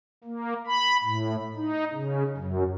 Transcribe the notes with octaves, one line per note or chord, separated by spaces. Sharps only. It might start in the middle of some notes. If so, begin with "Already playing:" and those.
A#3
B5
A2
D#4
C#3
F#2